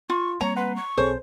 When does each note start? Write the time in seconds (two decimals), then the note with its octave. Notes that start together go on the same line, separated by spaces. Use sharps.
0.10 F4 C#6
0.41 G3 A#3 C4 C#5 A#5
0.56 B4 F#5 C6
0.76 C#6
0.98 B1 C4 G#4 A4 C5 C#5